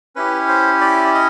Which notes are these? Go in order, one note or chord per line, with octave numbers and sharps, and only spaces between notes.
C#4 E4 G4 B4
C5
D5
D#5